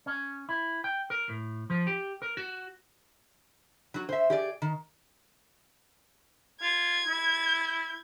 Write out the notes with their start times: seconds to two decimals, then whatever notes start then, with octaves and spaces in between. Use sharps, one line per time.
0.06 C#4
0.49 E4
0.84 G5
1.10 A#4
1.29 A2
1.70 F3
1.87 G4
2.22 A#4
2.37 F#4
3.94 F#3 F#4
4.09 C5 E5
4.30 G4 G#4 D5
4.62 D#3
6.62 F4 G#6
7.07 E4